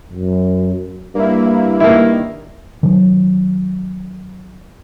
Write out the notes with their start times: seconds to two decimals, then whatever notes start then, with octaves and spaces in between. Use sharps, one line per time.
0.13 F#2
1.15 G2 A#3 E4
1.80 D#3 A#3 E4
2.83 D#3 F#3